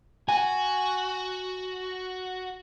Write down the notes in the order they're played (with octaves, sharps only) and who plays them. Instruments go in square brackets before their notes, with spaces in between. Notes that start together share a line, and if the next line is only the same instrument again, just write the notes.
[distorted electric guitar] F#4 [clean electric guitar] G#5